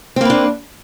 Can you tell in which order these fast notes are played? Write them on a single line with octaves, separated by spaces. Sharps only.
C4 A#3 B4 D4